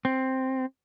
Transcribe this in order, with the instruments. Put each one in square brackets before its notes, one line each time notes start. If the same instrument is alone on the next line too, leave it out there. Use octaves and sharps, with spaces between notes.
[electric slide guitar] C4